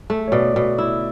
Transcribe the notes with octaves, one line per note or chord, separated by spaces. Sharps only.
A3
C#5
B2 D5
B2
E4